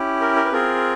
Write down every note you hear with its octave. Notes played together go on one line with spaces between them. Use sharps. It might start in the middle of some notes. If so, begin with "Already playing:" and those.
Already playing: C#4 E4 G4
A#4
A#4
B4
C4 F4 G#4 A#4